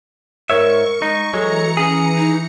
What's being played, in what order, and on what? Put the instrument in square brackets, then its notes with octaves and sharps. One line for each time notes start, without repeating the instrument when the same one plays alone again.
[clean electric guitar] G#2 C#5 E5 [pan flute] A#4 [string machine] C#6
[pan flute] G#3 [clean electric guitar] D#4
[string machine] E3 A#5 C#7 [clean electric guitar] F#3 G#3 [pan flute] A4
[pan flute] C#4 [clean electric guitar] G#4
[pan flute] D#4